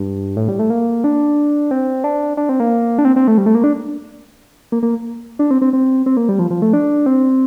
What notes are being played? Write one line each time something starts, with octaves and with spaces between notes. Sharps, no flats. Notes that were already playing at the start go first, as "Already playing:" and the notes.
Already playing: G2
A2
G3
A3
A#3
D4
C4
D4
D4
C4
A#3
D4
C4
C4
A3
G3
A3
A#3
D4
A#3
A#3
D4
C4
C4
C4
C4
A#3
G3
F3
F3
A3
D4
C4